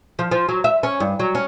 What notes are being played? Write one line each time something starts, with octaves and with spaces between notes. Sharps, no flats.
F3
F3
F#3
E5
C#4
G2
F#3
C#4